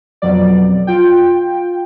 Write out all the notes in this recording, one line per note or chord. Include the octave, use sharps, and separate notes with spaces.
F2 B2 F#3 D5
F4 G5